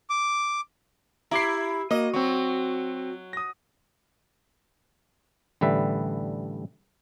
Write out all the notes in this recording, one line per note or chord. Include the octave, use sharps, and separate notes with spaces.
D6
E4 G4 A#5 D6 C7
A#3 F#4 D#5
F#3 C4 C#6
D#6 A#6
A1 D3 G3 B4 E5